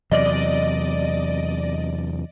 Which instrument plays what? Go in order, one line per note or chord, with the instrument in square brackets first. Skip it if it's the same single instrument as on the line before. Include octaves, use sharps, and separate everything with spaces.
[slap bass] E2 C3 F#3 [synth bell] D5 D#5